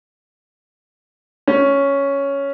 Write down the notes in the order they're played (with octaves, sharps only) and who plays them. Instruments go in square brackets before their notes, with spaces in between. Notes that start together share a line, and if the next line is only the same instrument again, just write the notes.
[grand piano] C#4